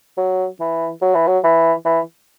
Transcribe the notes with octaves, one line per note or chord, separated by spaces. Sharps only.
F#3
E3
F#3
E3
F#3
E3
E3